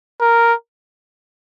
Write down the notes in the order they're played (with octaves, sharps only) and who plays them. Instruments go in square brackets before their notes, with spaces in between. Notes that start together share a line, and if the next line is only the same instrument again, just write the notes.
[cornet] A#4